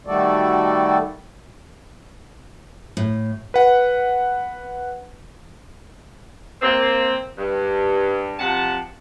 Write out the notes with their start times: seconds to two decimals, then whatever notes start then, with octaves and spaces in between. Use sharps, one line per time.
0.07 D#3 G3 A3 F#4 A4 D5
2.97 A2
3.54 B4 F#5
6.62 A#3 C4
7.38 G2
8.39 C3 F3 F#5 A5